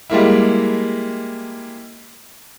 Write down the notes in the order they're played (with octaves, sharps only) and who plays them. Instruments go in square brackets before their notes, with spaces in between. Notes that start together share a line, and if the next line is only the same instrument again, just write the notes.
[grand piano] G3 G#3 A#3 E4